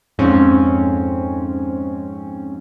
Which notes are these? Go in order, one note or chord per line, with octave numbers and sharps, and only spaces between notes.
F2 G#2 C4 C#4